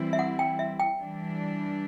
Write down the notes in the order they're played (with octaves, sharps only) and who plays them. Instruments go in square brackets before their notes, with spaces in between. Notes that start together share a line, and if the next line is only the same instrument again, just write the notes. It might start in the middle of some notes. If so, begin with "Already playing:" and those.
Already playing: [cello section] E3 G3 C4 E4
[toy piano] E5
F#5
G5
E5
G5
[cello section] E3 G3 D4